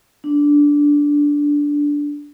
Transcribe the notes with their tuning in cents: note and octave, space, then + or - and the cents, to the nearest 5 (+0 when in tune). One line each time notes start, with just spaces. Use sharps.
D4 -10